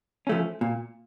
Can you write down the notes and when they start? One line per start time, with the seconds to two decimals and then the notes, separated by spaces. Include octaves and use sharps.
0.27 F3 A3 C#4
0.61 A#2